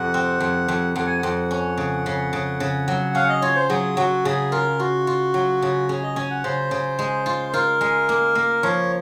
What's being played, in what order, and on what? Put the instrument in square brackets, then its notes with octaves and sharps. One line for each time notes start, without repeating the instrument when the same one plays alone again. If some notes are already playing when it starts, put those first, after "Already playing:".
Already playing: [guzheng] F2 C3 [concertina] F#5
[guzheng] C4
F2
F2
[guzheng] F2 [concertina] F#5
[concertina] G#5
F#5
[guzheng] F2
C#4
C#3
C#3
C#3
C#3
F#3
[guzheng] C#4 [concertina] F5
[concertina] D#5
[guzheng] F4 [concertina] C#5
[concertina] C5
[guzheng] F#3 [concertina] G#4
[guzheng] F#3 [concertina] F#4
[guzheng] C#3 [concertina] G#4
[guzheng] F4 [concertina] A#4
[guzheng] F4 [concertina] F#4
[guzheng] F4
F#3
C#3
[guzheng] C#4 [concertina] G#4
[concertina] D#5
[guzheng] C#4 [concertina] G#5
[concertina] F#5
[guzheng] C#3 [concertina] C5
[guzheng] C#3
G#3
F4
[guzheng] F4 [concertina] A#4
[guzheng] G#3
A#3
A#3
[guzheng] F3 [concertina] C#5